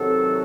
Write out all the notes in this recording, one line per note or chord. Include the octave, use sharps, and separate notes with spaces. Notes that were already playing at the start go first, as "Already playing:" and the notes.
Already playing: C3 D#3 F#3 A4